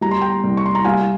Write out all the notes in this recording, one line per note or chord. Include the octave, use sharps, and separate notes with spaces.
G3 A#5
C6
G5 A#5
C2
C#6
C6
A#5
G3 F5 G#5